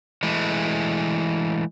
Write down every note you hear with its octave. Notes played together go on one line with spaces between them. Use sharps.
E3 G#3 A3